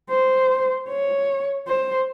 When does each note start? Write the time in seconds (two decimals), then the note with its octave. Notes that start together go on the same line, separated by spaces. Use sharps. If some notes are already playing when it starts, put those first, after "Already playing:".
0.10 C5
0.89 C#5
1.68 C5